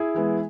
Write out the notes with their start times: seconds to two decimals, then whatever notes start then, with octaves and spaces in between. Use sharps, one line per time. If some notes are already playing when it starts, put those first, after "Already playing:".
Already playing: E4 G#4
0.15 E3 G#3 B3